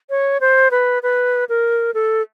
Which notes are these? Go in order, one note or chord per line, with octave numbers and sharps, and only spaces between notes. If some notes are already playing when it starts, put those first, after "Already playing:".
C#5
C5
B4
B4
A#4
A4